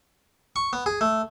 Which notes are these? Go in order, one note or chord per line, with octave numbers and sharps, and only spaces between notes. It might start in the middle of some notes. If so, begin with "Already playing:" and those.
C#6
B3
G#4
A3